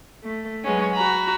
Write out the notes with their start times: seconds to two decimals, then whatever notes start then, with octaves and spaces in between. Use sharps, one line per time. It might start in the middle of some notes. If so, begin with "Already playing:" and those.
0.23 A3
0.63 F#3 G#3 B3 C#4
0.93 F#4 A#5 B5